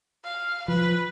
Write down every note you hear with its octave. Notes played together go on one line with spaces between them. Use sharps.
F5
F3 B4